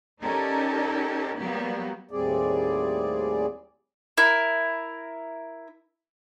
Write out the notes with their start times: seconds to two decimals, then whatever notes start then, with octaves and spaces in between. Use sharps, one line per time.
0.21 C#4 D#4 G4 A4 A#4 D5
1.37 F#3 G3 A#3 B3 G4
2.11 D#2 A2 G3 C4 G#4 D5
4.18 E4 A#4